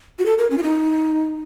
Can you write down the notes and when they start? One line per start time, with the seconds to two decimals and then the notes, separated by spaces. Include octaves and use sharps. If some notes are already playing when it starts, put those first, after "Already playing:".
0.19 F#4
0.26 A4
0.38 A#4
0.51 C#4
0.58 F4
0.63 D#4